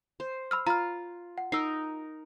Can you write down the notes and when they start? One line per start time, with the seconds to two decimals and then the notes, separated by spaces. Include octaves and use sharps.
0.20 C5
0.51 B5 E6 F6
0.67 F4 A#5 B5 F6
1.38 F#5
1.52 D#4 A#4 E6 C7